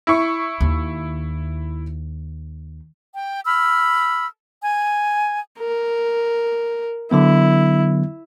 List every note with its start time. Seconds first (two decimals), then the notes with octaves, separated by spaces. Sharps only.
0.07 E4 C#6
0.61 D#2
3.13 G5
3.45 B5 E6 F6
4.61 G#5
5.59 A#4
7.11 D3 F#3 B3 E4